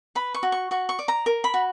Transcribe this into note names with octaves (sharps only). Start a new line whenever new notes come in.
B4 B5
C#6
F#4
C#6
F#4 C#6
C#6
D5
A#5
A#4
B5
F#4